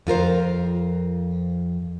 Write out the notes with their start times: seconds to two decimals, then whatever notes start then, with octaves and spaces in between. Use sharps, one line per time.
0.07 F2 F4 A#4 C5